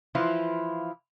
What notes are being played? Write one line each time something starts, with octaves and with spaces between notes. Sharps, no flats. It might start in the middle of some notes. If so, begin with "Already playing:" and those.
E3 F3 E4 F4